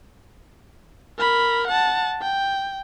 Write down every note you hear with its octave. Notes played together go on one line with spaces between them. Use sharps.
A#4 B5
F#5 A5
G5